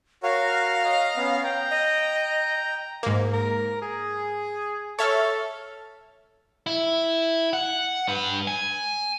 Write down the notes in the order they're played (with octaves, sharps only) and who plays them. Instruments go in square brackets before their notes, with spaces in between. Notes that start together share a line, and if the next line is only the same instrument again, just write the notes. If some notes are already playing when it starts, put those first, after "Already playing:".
[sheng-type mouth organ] F#4 A#4 C#5 [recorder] F5
[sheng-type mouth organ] D#5 A#5
B3 C#4
G5 A#5
[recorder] D#5
[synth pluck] G#2 A#3
[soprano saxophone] A#4
G#4
[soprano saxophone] A4 [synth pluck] C#5 E5 F6
[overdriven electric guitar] E4
F#5
G2 B4
G#5